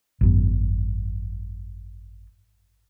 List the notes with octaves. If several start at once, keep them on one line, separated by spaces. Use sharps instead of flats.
G#1 F#2 B3